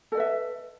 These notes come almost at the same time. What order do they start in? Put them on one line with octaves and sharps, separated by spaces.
A4 D#5 B4 E5